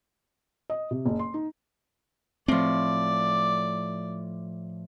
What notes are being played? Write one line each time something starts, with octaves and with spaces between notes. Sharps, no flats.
D#5
C3
F#1
C6
D#4
A2 F3 C4 D5